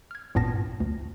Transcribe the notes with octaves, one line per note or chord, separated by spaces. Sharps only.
F6 G#6
G#1 G2 A#2 B3 A5 A#6
D2